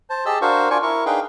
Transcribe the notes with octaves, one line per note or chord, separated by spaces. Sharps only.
C5 A5
G4 G#4 D#5 A5 E6
D4 F#4 A#4 C5 F5 C#6
D4 F4 D5 G#5 C#6
E4 A#4 C#6
D4 D#4 G#4 B4 F5 G5